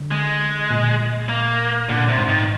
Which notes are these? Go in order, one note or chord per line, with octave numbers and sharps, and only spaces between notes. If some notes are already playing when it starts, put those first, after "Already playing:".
Already playing: D3
G#3
A#2
A#3
A#2 D3
C3
G#2
D#3